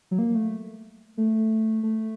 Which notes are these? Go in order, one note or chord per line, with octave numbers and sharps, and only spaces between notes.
F#3
A#3
A3
A3
A3